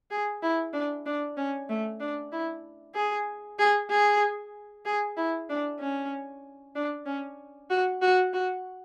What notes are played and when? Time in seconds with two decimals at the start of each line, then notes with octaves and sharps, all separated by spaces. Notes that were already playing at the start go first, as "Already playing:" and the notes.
0.11 G#4
0.42 E4
0.73 D4
1.06 D4
1.37 C#4
1.69 A3
2.00 D4
2.32 E4
2.95 G#4
3.59 G#4
3.90 G#4
4.85 G#4
5.17 E4
5.49 D4
5.80 C#4
6.76 D4
7.06 C#4
7.70 F#4
8.02 F#4
8.33 F#4